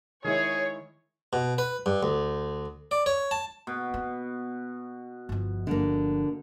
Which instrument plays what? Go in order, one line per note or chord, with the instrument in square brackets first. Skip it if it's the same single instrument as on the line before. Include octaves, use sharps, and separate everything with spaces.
[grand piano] D#3 G#3 E4 [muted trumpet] G#4 [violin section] C#5
[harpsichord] B2
B4
G2
D2
D5
C#5
A5
[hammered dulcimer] B2
[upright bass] B3
G1 F3
[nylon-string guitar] D3 A#3